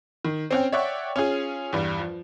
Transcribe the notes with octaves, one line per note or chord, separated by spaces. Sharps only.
D#3
C4 C#4 G5
C#5 D5 E5 F#5 G5
C#4 F4 G#4
E2 G2 G3
F3